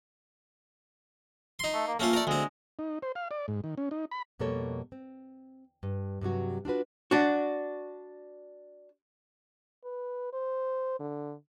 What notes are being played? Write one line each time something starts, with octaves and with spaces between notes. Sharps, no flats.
D#4 C6
A3
A#3
A3 A#3 C#4 F4
A3 A#4 D5
D2 G#3 C4
D#4
C5
F5
D5
G#2
D#3
C#4
D#4
B5
F2 B2 G3 A#3 A4 C#5
C4
G2
G2 C3 F#3 F#4
D4 F4 F#4 B4
D4 F#4
B4
C5
D3